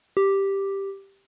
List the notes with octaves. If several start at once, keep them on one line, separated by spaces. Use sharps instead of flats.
G4